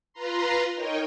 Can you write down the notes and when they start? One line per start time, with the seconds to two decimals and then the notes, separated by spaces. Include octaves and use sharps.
0.13 F4 B4 A#5 C6
0.75 D#4 A#4 C#5 D#5 G5